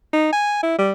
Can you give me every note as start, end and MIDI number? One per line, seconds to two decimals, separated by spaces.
0.13 0.32 63
0.32 0.63 80
0.63 0.74 64
0.78 0.92 55